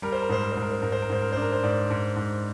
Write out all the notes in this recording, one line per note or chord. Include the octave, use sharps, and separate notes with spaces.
G3 A#4
C5
A#4
G#2 C5
A#4
G#2 C5
A#4
C5
G#2 A#4
C5
A#4
G#2 C5
A#4
D4 C5
A#4
C5
G#2 D5
G#2
G#2